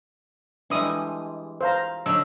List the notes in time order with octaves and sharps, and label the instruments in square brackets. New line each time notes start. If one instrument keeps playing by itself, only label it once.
[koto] E3 G3 G#3 [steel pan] D4 D#6
[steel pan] C5 F5 A#5
[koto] D3 F#3 D#4 [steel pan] E6